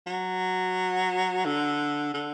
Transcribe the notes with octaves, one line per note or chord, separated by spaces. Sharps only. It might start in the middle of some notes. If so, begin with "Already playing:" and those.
F#3
D3
D3